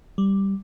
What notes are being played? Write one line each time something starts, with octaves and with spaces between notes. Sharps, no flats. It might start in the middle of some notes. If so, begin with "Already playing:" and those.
G3